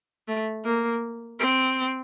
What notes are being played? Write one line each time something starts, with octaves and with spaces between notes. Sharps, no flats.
A3
A#3
C4